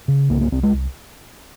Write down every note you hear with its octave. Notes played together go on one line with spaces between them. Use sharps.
C#3
C2 A#3
A#3
C2 C4
G#3